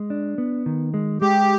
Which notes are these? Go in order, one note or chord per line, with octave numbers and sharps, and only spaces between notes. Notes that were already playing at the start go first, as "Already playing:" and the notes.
Already playing: G#3
D4
B3
D#3
G#3
G#3 G4